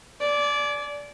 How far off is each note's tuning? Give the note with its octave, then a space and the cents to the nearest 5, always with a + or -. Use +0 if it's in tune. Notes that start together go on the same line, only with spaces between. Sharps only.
D5 -15 G#5 +35